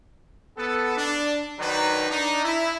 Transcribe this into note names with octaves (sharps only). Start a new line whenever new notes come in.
B3 A4
D4
D#3 F#3 D4 D#4 B4
D4 D#4
E4